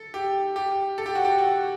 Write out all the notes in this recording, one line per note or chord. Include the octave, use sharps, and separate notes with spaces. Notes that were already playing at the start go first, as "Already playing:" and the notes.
Already playing: A4
G4
G4
A4
G4
F#4
G4
F#4